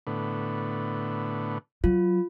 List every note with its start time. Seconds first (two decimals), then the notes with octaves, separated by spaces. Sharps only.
0.07 A2 D3 B3
1.84 F#3 F4